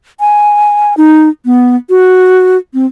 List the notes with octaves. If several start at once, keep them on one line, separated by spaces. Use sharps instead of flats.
G#5
D#4
B3
F#4
C4